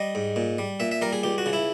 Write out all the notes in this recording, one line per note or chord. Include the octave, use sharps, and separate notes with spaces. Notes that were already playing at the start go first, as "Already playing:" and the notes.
Already playing: G3 D#5
G#2
A#2
G3
A#2 E5
E5
G3 A#4
G#4
C#2 G4
F#4
C#3
E4